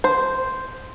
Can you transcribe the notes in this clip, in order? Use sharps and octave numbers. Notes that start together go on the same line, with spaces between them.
C5